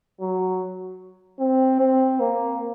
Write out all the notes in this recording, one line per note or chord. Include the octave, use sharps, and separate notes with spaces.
F#3
C4
C4
A#3